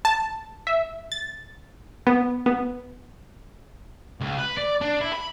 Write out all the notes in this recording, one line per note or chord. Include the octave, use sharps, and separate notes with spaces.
A5
E5
A6
B3
B3
C#2
B4
D5
D4
E4
B5